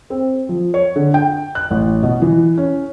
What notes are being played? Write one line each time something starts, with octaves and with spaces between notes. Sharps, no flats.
C4
F3
C#5
D3
G5
F#6
A1
B2
E3
C#4